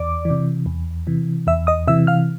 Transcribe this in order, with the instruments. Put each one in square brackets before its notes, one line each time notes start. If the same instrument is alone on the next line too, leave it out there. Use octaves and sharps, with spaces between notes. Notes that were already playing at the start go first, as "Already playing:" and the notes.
Already playing: [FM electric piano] E2 D5 D6
E3
C3
E2
C3 E3
E2 E5 E6
D#5 D#6
C3 E3 E5 E6
F5 F6